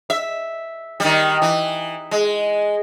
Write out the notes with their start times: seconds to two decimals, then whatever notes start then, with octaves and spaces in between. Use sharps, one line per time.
0.10 E5
1.00 D#3 G3
1.42 E3
2.11 G#3